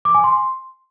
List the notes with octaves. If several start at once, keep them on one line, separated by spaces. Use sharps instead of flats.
D6
G#5
C6